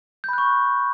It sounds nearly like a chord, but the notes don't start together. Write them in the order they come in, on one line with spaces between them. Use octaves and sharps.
G6 B5 F#6 C#6